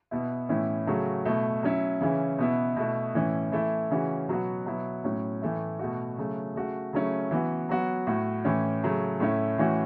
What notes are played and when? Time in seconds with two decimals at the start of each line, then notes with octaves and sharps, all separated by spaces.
0.11 B2 B3 E4
0.49 A2 E3 C#4 E4
0.87 C#3 F#3 A3 C#4 F#4
1.25 B2 A3 E4
1.63 F#3 C#4 E4
2.00 C#3 E3 C#4 E4
2.39 B2 B3 E4
2.76 B2 A3 E4
3.14 A2 E3 C#4 E4
3.52 E3 A3 E4
3.91 C#3 E3 C#4 F#4
4.28 B2 F#3 B3 F#4
4.66 B2 F#3 B3 E4
5.04 A2 F#3 C#4
5.42 A2 E3 A3 E4
5.79 B2 A3 F#4
6.18 C#3 F#3 A3
6.55 C#3 A3 F#4
6.93 C#3 F#3 A3 C#4 E4
7.31 E3 B3 F#4
7.69 F#3 B3 F#4
8.07 A2 A3 F#4
8.45 A2 E3 C#4
8.83 C#3 F#3 A3
9.20 A2 A3 C#4 E4
9.58 A2 E3 C#4 F#4